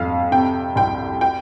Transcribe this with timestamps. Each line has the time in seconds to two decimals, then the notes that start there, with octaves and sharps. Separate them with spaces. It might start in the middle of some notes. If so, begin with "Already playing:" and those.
Already playing: F2 F5
0.31 C3 G5
0.76 C2 G5
1.21 G5